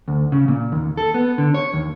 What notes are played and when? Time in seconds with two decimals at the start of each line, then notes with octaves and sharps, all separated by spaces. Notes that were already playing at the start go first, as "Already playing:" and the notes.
0.08 D2
0.32 C#3
0.48 A#2
0.72 D#2
0.97 A4
1.14 B3
1.38 D3
1.54 C#5
1.73 D#2